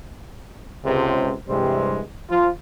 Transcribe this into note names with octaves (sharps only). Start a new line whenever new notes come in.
C#2 C3 C5
G2 C3 E3 G3 G#3 C4
F3 F4